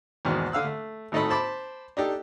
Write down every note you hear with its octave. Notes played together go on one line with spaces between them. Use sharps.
E2 G#2 B2 D#3
D3 F5 E6 F#6
A3
G#1 A2 D#4 A4 D#5 B5
C5 A5 B5 D6
D4 D#4 G4 A4